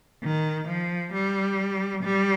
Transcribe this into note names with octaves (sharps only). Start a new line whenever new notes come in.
D#3
F3
G3
G3